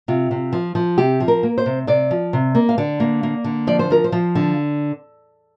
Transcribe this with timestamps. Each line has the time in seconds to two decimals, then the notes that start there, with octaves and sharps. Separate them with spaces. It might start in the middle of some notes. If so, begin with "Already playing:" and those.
0.08 C3 F4
0.31 C3
0.53 F3
0.75 F3
0.98 C3 G4
1.20 F3
1.28 A#4
1.43 A#3
1.58 C5
1.66 C3
1.87 C3 D5
2.11 F3
2.33 C3
2.55 A#3
2.69 F5
2.78 D3 D5
3.00 A#3
3.23 A#3
3.44 D3
3.67 F3 D5
3.79 C5
3.90 F3 A#4
4.04 C5
4.12 F3
4.35 D3